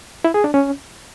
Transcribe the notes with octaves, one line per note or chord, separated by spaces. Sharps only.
E4
G#4
D4
C#4